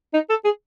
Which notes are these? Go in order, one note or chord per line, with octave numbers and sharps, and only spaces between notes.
D#4
A4
G#4